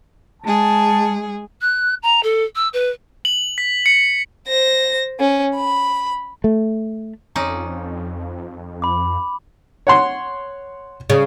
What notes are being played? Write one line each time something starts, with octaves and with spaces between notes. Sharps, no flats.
G#3 G#4 A5
F#6
A#5
A4
E6
B4
F#7
B6
C#7
C5 A#6
C#4
B5
A3
F2 C#4 D#4 D5
B5 D6
C#5 F#5 C6
C#3